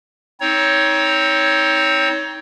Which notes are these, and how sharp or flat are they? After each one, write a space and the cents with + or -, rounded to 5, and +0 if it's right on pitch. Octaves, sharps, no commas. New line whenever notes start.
C4 +0 D#4 +25 C#5 +15